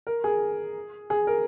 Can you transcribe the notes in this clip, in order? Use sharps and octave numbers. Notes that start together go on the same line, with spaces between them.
A#4
G#4
G#4
A#4